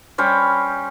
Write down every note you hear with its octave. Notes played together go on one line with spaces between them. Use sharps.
G3 C#4 C5